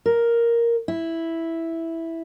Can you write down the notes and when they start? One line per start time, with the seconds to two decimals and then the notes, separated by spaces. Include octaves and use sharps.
0.06 A#4
0.88 E4